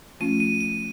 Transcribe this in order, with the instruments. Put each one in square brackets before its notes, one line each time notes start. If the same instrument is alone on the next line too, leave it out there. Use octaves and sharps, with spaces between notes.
[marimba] F3 A3 C#4 F4 [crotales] D#7
[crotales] D#7
D#7